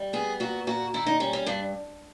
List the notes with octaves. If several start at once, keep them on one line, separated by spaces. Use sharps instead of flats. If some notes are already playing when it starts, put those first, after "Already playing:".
Already playing: G3
B3 G#4
A#2 F#4
A#2 F#4
D#3 E4
D#4
G3 C#4
C#4
G2 D4